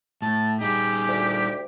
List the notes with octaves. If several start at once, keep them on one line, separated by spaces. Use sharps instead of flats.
A2 A5
G3 D#4 G4 G#4
D2